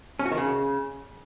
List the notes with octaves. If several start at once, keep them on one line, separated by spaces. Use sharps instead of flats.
C#4
F#4
D#3
C#3